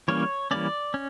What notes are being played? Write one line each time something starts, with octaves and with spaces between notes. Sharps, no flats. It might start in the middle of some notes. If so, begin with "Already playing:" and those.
E3 G3 A#3 C#4 C#5
E3 G3 A#3 C#4 D5
C#4